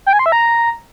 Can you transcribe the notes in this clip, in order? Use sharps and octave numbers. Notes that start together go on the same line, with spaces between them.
G5
G#5
C6
E5
A#5